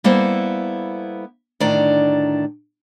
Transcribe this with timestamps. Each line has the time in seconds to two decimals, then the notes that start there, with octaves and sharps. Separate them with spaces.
0.04 G3 A#3 B3 E4 A4 C5
1.60 A2 D3 D#3 D4 D5 A#5